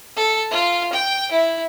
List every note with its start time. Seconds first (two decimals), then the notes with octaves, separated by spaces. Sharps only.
0.17 A4
0.51 F4
0.93 G5
1.32 E4